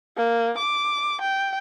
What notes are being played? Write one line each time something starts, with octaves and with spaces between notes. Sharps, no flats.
A#3
D6
G5